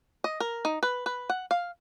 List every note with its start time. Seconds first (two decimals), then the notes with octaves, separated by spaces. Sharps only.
0.24 D#5
0.40 A#4
0.65 D#4
0.83 B4
1.06 B4
1.29 F#5
1.51 F5